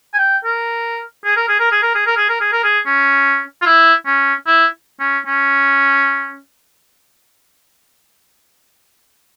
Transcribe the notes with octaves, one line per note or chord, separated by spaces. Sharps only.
G#5
G5
A#4
G#4
A#4
G#4
A#4
G#4
A#4
G#4
A#4
G#4
A#4
G#4
A#4
G#4
C#4
F4
E4
C#4
E4
C#4
C#4